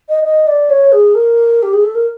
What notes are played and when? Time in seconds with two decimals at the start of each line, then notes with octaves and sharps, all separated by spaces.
0.09 D#5
0.24 D#5
0.47 D5
0.69 C#5
0.92 G#4
1.15 A#4
1.62 G4
1.73 G#4
1.84 A4
1.95 A#4